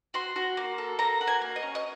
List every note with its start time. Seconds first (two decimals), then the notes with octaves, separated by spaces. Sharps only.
0.14 F#4 C6
0.36 F#4
0.57 A#3
0.78 A4
0.99 A#3 A#5
1.21 F#4
1.27 G#5
1.42 A#3
1.56 D#5
1.62 C#4
1.75 D#5